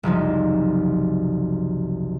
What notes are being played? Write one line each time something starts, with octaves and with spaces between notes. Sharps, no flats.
F#1 C2 F3 D#4